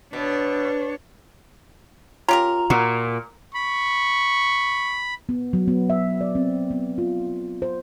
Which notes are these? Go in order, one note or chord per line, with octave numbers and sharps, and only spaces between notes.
B2 D4 C#5
C#4 F4 G4 A#4 A#5
A#2 F#4
B5 C#6
B3
F#3
B3
E5
D5
C4
B3
F4
C5